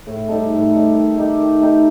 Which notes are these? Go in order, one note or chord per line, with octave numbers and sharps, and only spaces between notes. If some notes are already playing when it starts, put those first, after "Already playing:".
A2
G3 D#4 A4
A2
G3 D#4 A4
D#3
A3 D#4 G4
D#3
A3 D#4 G4